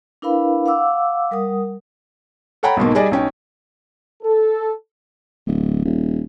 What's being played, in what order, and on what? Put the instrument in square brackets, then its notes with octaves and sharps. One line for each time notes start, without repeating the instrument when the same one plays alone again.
[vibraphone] D4 E4 A#4 B4 F5 B5
F5 F#5 D6 E6
G3 A#4 F#5 D#6
[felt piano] A4 C#5 F#5 G5 A#5 B5
B1 G#2 B2 A#3
G3 G#4 D5 D#5
B1 C#4 G5
[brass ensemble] A4
[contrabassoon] D1
D#1